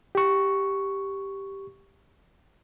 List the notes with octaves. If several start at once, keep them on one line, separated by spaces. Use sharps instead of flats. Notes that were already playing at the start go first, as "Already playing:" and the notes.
G4 C#6